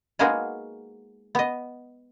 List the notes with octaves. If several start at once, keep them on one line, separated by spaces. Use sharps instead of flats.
G#3 A#3 B3 D#4 F#4 G#4
B3 D#5